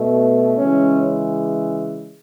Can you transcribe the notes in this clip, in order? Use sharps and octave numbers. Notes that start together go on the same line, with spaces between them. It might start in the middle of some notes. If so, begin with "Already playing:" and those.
Already playing: B2 A3
C#3 E3 G#3 C#4